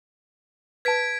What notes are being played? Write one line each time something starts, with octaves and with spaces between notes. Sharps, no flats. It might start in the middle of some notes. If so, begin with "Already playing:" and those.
B4 A5 G#6 B6 D7